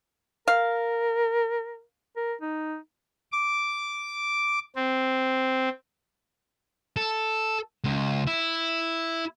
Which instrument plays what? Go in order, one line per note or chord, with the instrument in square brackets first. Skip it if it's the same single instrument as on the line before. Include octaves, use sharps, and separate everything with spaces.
[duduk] A#4 [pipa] F5
[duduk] A#4
D#4
[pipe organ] D6
C4
[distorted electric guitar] A4
C#2
E4